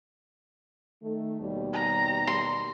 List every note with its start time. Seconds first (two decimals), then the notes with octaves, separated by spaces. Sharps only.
1.02 D#3 A3
1.40 D#2 B2 G3
1.73 A#5
2.27 C6